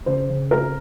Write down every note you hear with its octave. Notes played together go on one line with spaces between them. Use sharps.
C#3 C5
C#3
C4 A#4